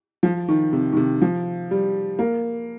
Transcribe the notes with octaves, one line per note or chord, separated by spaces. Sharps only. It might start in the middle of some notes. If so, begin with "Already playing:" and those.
F3
D#3
C3
D#3
C3
F3
G3
A#3